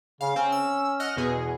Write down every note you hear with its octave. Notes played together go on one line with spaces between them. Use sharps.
C#3 F5
C4 C#4
E6
D#5 F#5 F6
E2 B2 G#4